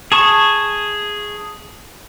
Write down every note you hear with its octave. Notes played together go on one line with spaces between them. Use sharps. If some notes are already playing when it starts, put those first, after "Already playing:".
G#4 A5 C#6